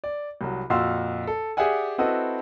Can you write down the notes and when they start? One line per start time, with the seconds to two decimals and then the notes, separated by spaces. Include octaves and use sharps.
0.04 D5
0.41 C2 F#3
0.70 F2 A#2 F#4 F5 C6 E6
1.27 A4
1.57 G4 G#4 D5 E5 F#5 G#5
1.98 C4 E4 F#4 A4 B4 D#5